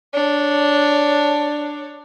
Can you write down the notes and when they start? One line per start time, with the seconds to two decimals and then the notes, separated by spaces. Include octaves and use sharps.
0.13 D4 C#5